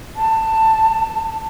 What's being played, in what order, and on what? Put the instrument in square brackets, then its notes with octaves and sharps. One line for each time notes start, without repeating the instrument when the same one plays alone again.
[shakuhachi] A5